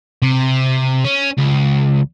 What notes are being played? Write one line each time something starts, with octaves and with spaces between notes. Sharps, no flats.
C3
C#4
C#2